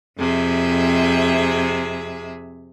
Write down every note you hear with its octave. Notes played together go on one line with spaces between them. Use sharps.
F2 C3 G#4 E5